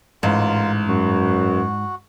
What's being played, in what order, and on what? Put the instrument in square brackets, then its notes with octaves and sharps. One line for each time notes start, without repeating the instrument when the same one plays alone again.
[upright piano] A1 [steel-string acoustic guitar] G#2 [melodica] F4 A#4
[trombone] F#2 [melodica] F#4